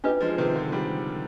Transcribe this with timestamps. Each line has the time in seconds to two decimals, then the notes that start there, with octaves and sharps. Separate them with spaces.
0.04 D4 D#4 F4 G4 B4 D#5
0.21 F3 G#3
0.38 C3 D#3
0.56 D3 F3
0.72 D#3 G3